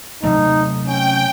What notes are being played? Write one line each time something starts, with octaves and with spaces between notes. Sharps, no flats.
C3 F#3 A3 D#4
C#4 G5